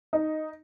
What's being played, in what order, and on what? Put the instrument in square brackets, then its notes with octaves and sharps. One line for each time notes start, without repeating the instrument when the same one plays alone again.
[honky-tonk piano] D#4